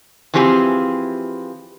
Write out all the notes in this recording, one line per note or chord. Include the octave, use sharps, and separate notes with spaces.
E3 F3 C4 G4 G#4